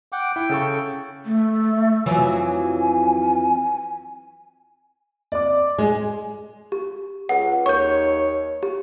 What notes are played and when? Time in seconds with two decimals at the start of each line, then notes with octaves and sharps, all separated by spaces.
0.12 F#5 G5 D6
0.36 E4 G5
0.49 C#3 A4 C#6
1.26 A3
2.06 F2 E3 F#3 G#5
5.32 D5 D6
5.78 G#3 G#4
6.72 G4
7.29 C#2 F#5
7.66 D#2 C#5 C#6 G6
8.63 G4